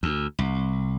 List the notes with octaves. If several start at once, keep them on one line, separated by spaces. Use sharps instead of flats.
D2
C2